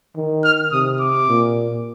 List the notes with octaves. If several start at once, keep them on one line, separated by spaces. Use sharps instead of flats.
D#3
F6
C3 D#6
D6
A#2